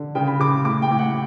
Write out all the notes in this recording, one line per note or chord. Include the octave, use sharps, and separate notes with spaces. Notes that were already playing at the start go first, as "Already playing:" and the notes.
Already playing: D3
C#3 G5
B5
C#3 D6
A2 D6
G5
A2
F#5